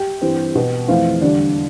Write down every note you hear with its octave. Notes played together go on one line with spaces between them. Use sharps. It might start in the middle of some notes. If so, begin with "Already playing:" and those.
Already playing: G4 G5
G2 E3 G3 C4
B2 B3
F2 E3 A3 C4 F4 F5
E2 D3 G3 D4 D5